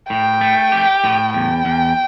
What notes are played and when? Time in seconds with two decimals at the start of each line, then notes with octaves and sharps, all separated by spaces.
0.10 A2 G5
0.41 A3
0.72 G4
1.04 A2
1.34 E2 G5
1.65 E2